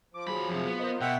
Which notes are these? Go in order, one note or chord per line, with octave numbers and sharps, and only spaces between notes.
F3 D6
D#2 F#3 G#4 B5
F2 C3
B3
A#4 C5 D#5
B2 E5 F#5 G5